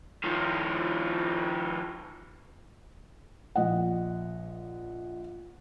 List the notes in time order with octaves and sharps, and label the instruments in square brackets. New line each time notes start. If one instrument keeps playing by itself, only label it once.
[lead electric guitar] D#3 F3
[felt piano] A#1 D#5 F#5